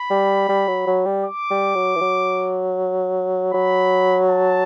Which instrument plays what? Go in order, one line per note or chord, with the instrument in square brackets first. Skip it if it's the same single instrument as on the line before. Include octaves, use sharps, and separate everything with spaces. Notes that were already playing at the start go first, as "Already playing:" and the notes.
Already playing: [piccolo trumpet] B5
[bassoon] G3
G3
F#3
F#3
G3
[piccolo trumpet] D6
[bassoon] G3
F#3
E3
F#3
[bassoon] F#3 [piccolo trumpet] B5
[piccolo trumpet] A5